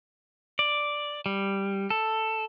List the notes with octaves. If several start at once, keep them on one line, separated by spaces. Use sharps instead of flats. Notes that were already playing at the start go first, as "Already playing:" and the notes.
D5
G3
A4